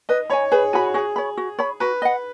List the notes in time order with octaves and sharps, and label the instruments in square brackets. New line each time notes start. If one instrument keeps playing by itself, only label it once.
[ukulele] B4 [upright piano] D#5
[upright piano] C#5 [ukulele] B5
[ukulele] G#5
[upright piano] G#4 [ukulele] B4
[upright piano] F#4 [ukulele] G#5 B5
[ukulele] F#4 [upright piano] G#4
[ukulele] C#5 B5
F#4
C#5 B5
[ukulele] F#4 [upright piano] B4
[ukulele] D#5 F#5